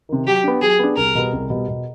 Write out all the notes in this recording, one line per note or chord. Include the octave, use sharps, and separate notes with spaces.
C3 D#3
F#3 G4
B3 D4
F#3 G#4
B3 D4
C2 A#4
B2 G3 B3
C2
B2 G3 B3
B2